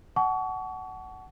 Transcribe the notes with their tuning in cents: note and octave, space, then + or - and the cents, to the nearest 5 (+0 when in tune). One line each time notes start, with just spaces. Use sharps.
F#5 +20 A5 -35 C#6 +35